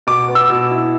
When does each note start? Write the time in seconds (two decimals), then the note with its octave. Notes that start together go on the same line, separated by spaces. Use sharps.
0.07 B2 D6
0.28 B3
0.35 E6
0.50 B2
0.71 E4